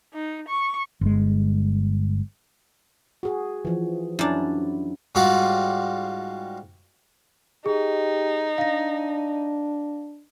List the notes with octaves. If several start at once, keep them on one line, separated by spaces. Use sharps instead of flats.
D#4
C#6
G1 G#3
F#4 G#4
E3 F3
F#2 D4 E4
G#2 G3 F4 F#4 D5
D#4 G4 G#4
D4 F5 A#6